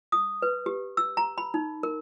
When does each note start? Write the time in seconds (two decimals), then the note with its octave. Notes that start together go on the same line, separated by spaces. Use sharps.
0.12 D#6
0.42 B4
0.66 G4
0.97 E6
1.17 A#5
1.38 B5
1.54 D#4
1.83 A#4